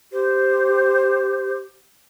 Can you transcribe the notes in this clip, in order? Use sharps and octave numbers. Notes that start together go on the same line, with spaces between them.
G4 C5